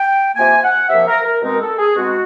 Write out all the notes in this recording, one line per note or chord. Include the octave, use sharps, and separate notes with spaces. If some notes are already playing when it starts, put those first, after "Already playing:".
Already playing: G5
C3 F3 A#3 G#5
F#5
C3 F3 A#3 E5
A#4
A#4
B2 G#3 C4 D#4 A#4
A4
G#4
B2 G#3 C4 D#4 F#4